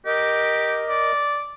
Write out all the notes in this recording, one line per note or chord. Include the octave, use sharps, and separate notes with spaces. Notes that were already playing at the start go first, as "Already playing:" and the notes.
G4 A#4 D#5
D5